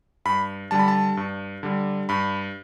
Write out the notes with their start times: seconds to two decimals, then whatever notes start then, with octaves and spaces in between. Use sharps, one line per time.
0.25 G2 B5
0.71 D3 G3 A5
0.79 B5
0.88 A5
1.17 G2
1.63 D3 G3
2.09 G2 B5